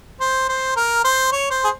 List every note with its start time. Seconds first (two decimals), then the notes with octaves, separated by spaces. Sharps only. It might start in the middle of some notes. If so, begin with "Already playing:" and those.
0.21 C5
0.49 C5
0.76 A#4
1.04 C5
1.32 C#5
1.51 C5
1.64 G#4